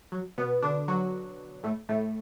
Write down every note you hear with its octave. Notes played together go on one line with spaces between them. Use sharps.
F#3
B2 B3
D3 D4
F#3 F#4
A2 A3
A2 A3